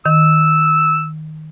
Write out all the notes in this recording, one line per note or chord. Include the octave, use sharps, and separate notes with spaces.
D#3 E6